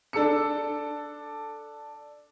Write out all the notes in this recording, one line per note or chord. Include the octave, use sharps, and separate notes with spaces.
D4 A4 E6 C#7